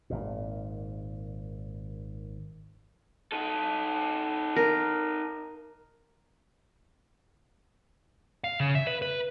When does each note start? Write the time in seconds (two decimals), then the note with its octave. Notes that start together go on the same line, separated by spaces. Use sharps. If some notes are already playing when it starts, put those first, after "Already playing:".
0.10 G#1 A#2
3.32 D#4 A4
4.56 A#4
8.44 F5
8.60 C#3
8.75 E5
8.87 B4
9.02 B4